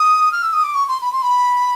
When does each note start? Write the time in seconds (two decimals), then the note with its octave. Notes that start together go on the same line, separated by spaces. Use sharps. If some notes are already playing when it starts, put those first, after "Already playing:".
Already playing: D#6
0.32 F6
0.42 E6
0.53 D#6
0.63 D6
0.74 C#6
0.88 C6
1.01 B5
1.12 C6
1.22 B5